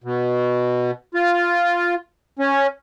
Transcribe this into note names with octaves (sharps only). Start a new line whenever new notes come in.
B2
F4
C#4